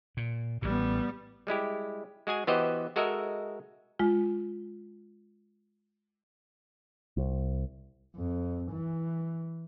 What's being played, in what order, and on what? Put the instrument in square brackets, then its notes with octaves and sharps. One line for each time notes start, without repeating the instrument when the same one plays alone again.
[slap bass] A#2
[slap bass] A1 A2 [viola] G3 B3
[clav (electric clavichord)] G3 G#3 E4 G4
G#3 F#4 G#4 G#5
E3 B3 F#4 G4 C5 D#5
G#3 F#4 A4 A#4 D#5 E5
[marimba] G#3 F4
[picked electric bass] C2
[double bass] F2
E3